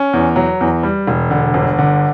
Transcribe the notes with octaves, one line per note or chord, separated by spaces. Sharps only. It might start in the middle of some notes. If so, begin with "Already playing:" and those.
Already playing: C#4
E2
F#3
E2
G3
E1
D3
G1
D3